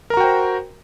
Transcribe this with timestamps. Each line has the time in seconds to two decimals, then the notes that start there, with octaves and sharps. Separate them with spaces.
0.10 A#4
0.14 A#5
0.17 F#4
0.20 G5
0.24 C5